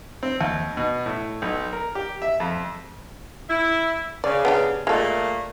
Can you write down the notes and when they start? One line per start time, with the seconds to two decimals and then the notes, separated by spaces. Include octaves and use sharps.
0.23 C4
0.41 D#2
0.77 B2
1.06 A2
1.42 B1
1.73 A#4
1.95 G4
2.22 E5
2.40 F2
3.50 E4
4.24 C#3 D5
4.45 B3 D4 G4
4.87 A#2 G#3 A3 A4